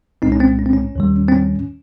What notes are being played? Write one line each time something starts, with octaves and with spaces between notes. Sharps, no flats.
C2 A#2 G#3 C4 D#4
C#4
C4
C#4
C4
C#4
D#2 D#3 G3
C4
C#4